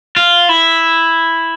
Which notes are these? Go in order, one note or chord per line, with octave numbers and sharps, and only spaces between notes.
F4
E4